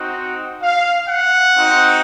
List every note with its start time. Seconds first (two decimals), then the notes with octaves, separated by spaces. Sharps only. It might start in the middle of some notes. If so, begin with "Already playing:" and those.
Already playing: C4 D#4 F#4
0.62 F5
1.08 F#5
1.55 C4 D#4 F#4